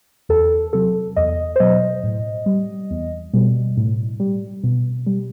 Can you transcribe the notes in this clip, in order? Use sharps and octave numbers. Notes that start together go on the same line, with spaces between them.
E2 A4
C3 F#3 A4
E2 D#5
C5
B2 F#3 D#5
A2
G3
E2
B2 G3
A2
G3
B2
G3